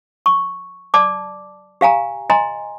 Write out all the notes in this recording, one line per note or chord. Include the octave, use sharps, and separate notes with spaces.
C#6
D5 A5 D6
G4 F5 G#5 A#5
D#5 G#5 A#5 C6